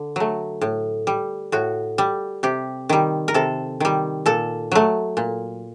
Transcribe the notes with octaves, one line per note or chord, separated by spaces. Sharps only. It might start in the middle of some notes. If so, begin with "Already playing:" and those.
Already playing: D3
F#3 A3
A2
G3
A2 F#4
G3
C3 G4
D#3 G3
A#4
C3 A4
D#3 G3
A#2 A4
F#3 A3
A#2